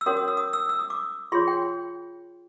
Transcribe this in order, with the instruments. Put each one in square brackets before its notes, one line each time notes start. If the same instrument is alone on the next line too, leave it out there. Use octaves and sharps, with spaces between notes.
[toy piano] E6
C#4 F#4 A#4 C#5 D#6
D#6
E6
D#6
E6
E6
D#6
D6
F4 G#4 C#5 C6
G5